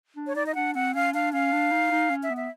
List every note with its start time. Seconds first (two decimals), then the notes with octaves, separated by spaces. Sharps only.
0.16 D4
0.27 C#5
0.35 D#4 D5
0.46 D#5
0.55 D4 F#5
0.75 C4 F#5
0.95 C#4 F5
1.13 D4 F5
1.33 C#4 F5
1.52 D4
1.72 D#4
1.91 D#4
2.10 C#4
2.23 E5
2.30 B3
2.37 E5